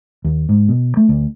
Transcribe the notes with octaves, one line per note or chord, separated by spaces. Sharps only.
D#2
G#2
B2
A3
D2